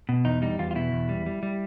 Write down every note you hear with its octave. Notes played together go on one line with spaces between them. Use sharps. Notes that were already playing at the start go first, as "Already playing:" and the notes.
B2
E2 D#4
G3 D#4
E2 F4
F4
B2 E4
E2
G3
G3
G3